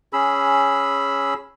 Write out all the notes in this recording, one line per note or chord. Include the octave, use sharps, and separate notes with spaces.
C#4 G#4 B5 E6